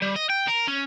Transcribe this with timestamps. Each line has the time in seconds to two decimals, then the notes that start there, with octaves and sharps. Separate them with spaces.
0.02 G3
0.16 D#5
0.30 G5
0.47 A#4
0.67 C#4